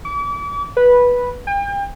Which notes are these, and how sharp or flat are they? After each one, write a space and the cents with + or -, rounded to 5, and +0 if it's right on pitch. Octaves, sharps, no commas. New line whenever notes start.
D6 -40
B4 -10
G5 +40